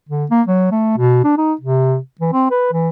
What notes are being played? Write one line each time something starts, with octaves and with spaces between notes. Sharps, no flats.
D3
A#3
F#3
A3
B2
D4
D#4
C3
E3
C4
B4
E3